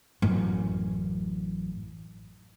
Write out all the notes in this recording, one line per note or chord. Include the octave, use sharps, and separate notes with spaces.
A1 F#2